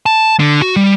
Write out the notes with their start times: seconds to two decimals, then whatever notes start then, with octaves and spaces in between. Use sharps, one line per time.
0.06 A5
0.40 D3
0.62 F#4
0.76 G3